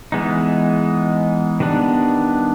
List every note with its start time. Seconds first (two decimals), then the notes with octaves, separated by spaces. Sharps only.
0.12 E3 G#3 B3 D#4
1.60 D#3 G3 B3 D4